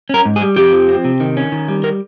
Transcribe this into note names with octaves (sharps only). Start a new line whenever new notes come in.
C#4 A#4
G#2
G#4
G3
F2 G4
F3
C4
C3
D#3
C#4
D#3
G3
A#4